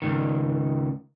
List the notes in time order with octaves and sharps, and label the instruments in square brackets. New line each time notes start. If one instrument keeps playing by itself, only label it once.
[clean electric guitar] C#2 G#2 D#3